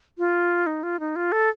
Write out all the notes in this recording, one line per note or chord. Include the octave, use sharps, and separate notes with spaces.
F4
D#4
F4
D#4
F4
A4